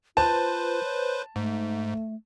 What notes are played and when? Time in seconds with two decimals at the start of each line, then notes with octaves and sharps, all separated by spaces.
0.17 F4 B4 C5 A5
0.83 C#5
1.36 G#2 A3